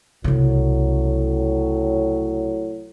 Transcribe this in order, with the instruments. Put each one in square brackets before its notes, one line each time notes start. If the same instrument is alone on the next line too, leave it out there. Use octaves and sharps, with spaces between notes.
[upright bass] C2 C#3 [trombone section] A2 F#3